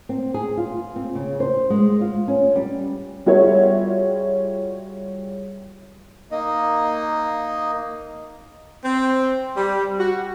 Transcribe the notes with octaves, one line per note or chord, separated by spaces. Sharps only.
C4
G#4
F4
C4
C#3
C5
G#3
F4
C#4
G3
G3 F4 F#4 G#4 C#5 E5
A#3 D#4 D#5
C4
G3
F#4